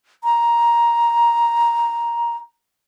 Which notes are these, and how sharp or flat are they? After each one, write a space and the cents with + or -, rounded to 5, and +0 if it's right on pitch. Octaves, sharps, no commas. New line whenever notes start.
A#5 +10